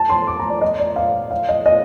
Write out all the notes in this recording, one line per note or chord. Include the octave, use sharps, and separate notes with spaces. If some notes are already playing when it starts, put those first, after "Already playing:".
Already playing: A5
C6
D6
A#5
D5
D#5
D5
F5
F5
D#5
D#5